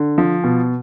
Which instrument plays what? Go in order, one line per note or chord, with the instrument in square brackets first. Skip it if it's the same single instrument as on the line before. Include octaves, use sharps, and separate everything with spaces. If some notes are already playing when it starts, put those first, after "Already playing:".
Already playing: [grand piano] D3
F3
B2